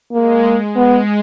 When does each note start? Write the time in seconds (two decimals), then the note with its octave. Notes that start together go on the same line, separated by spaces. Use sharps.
0.13 G#3 A#3
0.76 G#3 B3